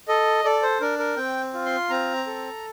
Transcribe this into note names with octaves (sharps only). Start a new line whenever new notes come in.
A4 D#5
A4 D5
C5
D4 A#4
A#4
C4 G5
F4
C6
C4 A#5
A4